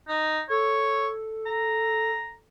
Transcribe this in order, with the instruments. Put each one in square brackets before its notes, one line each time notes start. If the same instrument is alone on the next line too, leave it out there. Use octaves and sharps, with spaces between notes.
[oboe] D#4
[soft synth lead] A4 [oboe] C#5
[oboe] A#5